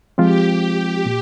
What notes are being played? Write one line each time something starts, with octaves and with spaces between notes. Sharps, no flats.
F3 G#3 C4 F4 G4
A#2